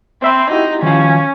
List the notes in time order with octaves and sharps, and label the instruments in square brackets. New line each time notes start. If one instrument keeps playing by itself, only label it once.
[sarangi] C4 [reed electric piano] C5 E5 B5
[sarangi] D#4 [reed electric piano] E4 F#4 G4
[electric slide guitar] D#3 F3 F5 [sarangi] C#4